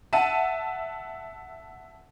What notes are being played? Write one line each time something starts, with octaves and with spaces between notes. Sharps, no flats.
E5 F#5 A5 D#7